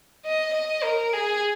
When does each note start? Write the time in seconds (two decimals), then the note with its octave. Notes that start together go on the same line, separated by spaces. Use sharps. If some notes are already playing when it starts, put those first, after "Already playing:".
0.25 D#5
0.54 D#5
0.83 A#4
1.13 G#4